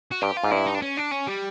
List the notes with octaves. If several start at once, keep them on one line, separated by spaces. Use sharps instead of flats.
F#4
G2 G4
F4
G#2
G2 E4
D#4
D4
C#4
D4
C#4
G3